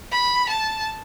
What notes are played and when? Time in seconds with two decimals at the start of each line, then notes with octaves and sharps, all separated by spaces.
0.12 B5
0.50 A5